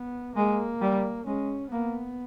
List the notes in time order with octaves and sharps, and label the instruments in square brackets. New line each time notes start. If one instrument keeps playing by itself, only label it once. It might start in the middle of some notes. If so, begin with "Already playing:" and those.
Already playing: [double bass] B3
[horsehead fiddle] G#3 [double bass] A#3
[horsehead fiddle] G3
[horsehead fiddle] G#3 [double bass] C#4
[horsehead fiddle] A#3 [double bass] B3